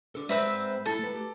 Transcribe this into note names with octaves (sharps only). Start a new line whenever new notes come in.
D4 A4
G#3 C4 B4 C5 E5
E4 A4 A5
A3 B4
G4